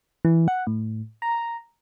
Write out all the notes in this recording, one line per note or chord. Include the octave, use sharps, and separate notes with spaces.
E3
F#5
A2
A#5